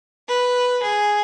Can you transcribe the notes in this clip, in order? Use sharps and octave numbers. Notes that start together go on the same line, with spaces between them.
B4
G#4